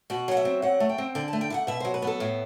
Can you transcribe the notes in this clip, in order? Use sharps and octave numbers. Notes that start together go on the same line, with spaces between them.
B2 F#4
F#3 F#5
E5
C4
F#3 F#5
A3
G5
C4
D3 G5
A5
A3
G5
E4
F#5
B2 E5
F#3 C5
B4
B3 A4
A2